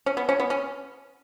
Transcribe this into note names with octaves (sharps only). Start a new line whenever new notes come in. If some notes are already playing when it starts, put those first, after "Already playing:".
C#4
B3
C#4
B3
C#4